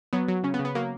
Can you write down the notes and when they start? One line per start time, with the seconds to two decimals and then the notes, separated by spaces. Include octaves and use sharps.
0.13 F#3 B3
0.28 F#3
0.44 C#3 C#4
0.54 B3
0.59 C#3
0.65 B3
0.75 F#3 A#3